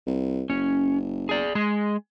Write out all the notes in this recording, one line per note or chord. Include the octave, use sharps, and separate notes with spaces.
C2
F#1 C#4
G#4 D5
G#3 G#4